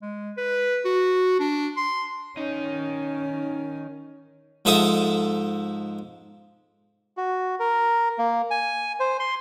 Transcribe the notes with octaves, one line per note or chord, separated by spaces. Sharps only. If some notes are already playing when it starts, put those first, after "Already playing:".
G#3
B4
F#4
D4
C6
D#3 C#4 D#4
G#2 F3 A4 E5 D#6
F#4
A#4
A#3
G#5
C5
C6